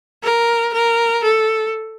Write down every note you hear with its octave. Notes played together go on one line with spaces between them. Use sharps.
A#4
A#4
A4